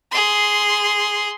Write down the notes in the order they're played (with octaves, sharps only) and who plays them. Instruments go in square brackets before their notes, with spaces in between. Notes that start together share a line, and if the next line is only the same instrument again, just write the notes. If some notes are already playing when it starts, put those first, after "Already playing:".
[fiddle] G#4 C6